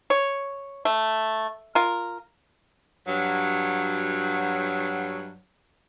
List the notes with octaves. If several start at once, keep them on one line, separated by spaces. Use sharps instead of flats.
C#5
A3
F4 A#4
G2 F#3